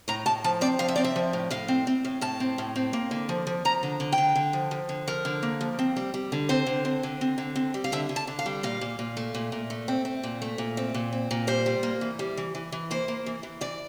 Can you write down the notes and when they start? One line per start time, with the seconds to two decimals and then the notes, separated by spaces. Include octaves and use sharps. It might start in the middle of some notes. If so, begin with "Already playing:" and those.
0.08 A2 A#5
0.26 A2 A5
0.44 F3 A5
0.61 C4 D5
0.79 F3 F5
0.88 E5
0.96 C4 D5
1.04 E5
1.16 F3
1.33 A2
1.51 A2 F5
1.68 C4
1.87 C4
2.05 A2
2.21 A2 A5
2.40 C4
2.58 A2
2.76 C4
2.93 A#3
3.11 D3
3.29 F3
3.47 F3
3.65 F3 A#5
3.83 D3
4.00 D3
4.12 G5
4.18 D3
4.36 D3
4.53 F3
4.71 F3
4.89 D3
5.07 F3 A#4
5.25 D3
5.43 A#3
5.61 F3
5.79 C4
5.96 G3
6.14 G3
6.32 D3
6.49 C4 C5
6.67 D3
6.85 C4
7.03 D3
7.21 C4
7.38 D3
7.56 C4
7.74 G3
7.84 F5
7.92 D3 E5
8.09 D3
8.16 A5
8.27 D3
8.39 F5
8.46 G3
8.63 A#2 F5
8.81 A#2
8.99 A#2
9.17 A3
9.34 A#2
9.52 A#2
9.70 A3
9.88 C4
10.05 C4
10.23 A#2
10.42 A3
10.58 A#2
10.77 C4
10.94 A#2
11.13 C4
11.31 A#2
11.47 G3 C5
11.66 G3
11.83 A#3
12.01 E3
12.19 G3
12.37 E3
12.55 E3
12.72 E3
12.91 A#3 C5
13.08 A#3
13.26 E3
13.43 E3
13.61 E3 D5